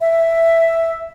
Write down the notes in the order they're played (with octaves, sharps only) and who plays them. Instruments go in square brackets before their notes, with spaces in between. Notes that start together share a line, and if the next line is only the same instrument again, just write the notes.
[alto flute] E5